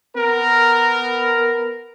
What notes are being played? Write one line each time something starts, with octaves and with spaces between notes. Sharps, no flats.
B3 A#4